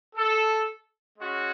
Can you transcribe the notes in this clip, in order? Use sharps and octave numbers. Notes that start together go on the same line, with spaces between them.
A4
G#3 C#4 F#4